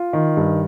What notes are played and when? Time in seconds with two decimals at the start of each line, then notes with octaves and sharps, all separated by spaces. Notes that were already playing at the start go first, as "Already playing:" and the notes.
Already playing: F4
0.13 D#3
0.37 G2